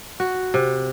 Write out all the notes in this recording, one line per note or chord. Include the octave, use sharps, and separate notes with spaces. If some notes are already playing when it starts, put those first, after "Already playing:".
F#4
C3